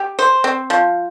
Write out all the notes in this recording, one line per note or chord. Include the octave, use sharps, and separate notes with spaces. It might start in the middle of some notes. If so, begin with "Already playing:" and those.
Already playing: G4
C5
C4
F3